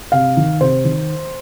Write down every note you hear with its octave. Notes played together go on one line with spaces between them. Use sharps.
C3 F5
D#3
C3 C5
D#3